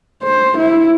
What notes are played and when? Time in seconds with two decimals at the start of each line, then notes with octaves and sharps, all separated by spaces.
0.23 C5
0.57 E4